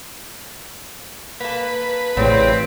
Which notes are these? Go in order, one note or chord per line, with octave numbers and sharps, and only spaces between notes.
A#3 A4 B4
A1 A2 C#3 G3 C4